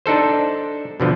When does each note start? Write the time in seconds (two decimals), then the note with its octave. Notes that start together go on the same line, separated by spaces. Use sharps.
0.06 D4 D#4 A4 C5
1.00 B2 D3 F3